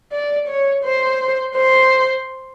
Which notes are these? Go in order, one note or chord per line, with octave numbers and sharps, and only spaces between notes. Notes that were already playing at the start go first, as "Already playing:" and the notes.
D5
C#5
C5
C5